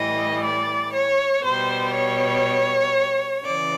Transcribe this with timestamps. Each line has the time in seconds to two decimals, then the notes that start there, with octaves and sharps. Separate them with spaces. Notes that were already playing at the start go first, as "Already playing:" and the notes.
Already playing: A2 E3 G3 D#5
0.43 D5
0.94 C#5
1.43 B2 G3 C5
1.94 C#5
3.45 C#3 E3 D5